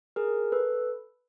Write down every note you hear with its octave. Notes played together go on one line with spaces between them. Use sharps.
G#4 A#4
A4 B4